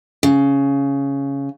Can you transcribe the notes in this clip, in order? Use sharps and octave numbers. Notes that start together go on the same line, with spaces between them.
C#3